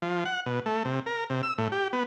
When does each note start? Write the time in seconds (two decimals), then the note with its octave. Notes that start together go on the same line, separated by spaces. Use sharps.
0.02 F3
0.25 F#5
0.46 B2
0.66 A3
0.85 C3
1.06 A#4
1.30 C3
1.43 E6
1.58 A2
1.72 G4
1.93 B3